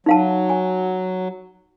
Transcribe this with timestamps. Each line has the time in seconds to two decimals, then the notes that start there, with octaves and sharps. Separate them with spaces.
0.06 F#3 D#4 F5 A5
0.49 G#5